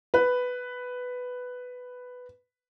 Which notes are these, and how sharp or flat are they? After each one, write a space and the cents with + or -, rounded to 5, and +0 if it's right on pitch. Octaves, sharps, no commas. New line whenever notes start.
B4 +5